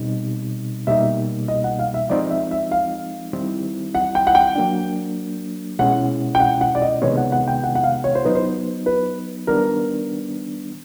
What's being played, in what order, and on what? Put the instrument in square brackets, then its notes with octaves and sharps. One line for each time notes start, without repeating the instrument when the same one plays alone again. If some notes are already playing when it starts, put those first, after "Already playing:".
Already playing: [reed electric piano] B2 G3 C4 D#4
[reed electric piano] B2 G3 A#3 D#4 [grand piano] E5
[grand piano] D#5
F#5
F5
E5
[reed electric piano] F3 G#3 C4 D#4 [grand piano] D5
[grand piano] E5
E5
F5
[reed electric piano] D#3 G3 C4 E4
[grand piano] F#5
G5
F#5
G5
[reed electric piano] F#3 A#3 D4
[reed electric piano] B2 G#3 C#4 E4 [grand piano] F#5
[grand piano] G5
F#5
F#5
D5
D#5
[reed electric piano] C3 D#3 G#3 B3 [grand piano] C#5
[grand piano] F#5
F#5
G5
F#5
F#5
F5
C#5
C5
[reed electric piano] F#3 B3 D#4 [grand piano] B4
[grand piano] C5
B4
[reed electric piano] D#3 G3 B3 D4 [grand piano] A#4